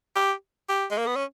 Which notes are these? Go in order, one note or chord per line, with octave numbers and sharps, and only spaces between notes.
G4
G4
G#3
A#3
B3
C#4